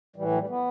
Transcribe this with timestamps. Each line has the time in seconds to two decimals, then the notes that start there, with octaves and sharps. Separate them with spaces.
0.16 A2 E3 G3
0.32 F#3
0.38 G3
0.49 B3